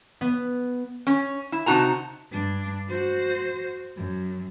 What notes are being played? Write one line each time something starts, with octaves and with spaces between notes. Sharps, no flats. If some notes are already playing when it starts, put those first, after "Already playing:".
B3
C#4
E4
C3 D#4 F#4 A5 A#5
G2 D4
F#4 C5
F#2